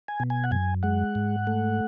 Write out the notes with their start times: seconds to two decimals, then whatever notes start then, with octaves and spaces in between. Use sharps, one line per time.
0.08 G#5
0.20 B2
0.30 G#5
0.44 F#5
0.51 F#2 G#5
0.83 G#3 F#5
1.15 G#2
1.47 A3